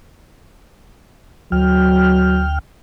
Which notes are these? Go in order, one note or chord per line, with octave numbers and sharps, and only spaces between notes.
D2 F#3 G5 F6